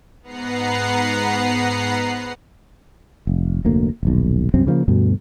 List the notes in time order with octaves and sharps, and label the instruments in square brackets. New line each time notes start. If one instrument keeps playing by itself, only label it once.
[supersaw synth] G#2 B3 B4 F#5 A#5 C7
[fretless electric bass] F1
F1 D2 A#3
D#1 B1
C2 F#2 C4
C#3 F3 G3 A#3
D2 G2 B2